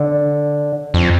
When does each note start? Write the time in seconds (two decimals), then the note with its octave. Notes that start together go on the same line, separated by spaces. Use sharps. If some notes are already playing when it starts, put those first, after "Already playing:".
Already playing: D3
0.94 F2